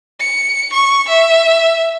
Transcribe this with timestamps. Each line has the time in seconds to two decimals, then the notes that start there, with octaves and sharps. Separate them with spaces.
0.20 C#7
0.73 C#6
1.08 E5